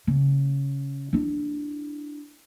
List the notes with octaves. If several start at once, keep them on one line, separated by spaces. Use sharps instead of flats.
C#3
D4 E4